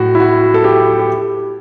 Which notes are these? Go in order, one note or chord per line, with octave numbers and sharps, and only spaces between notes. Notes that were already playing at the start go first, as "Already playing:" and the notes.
Already playing: A2 F#4
E4
F#4
A4
G4
G4